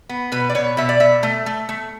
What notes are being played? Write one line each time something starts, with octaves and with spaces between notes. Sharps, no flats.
B3
B2 B4
D5
B2 C#5
B2 E5
D5
B2 E5
A3
A3
A3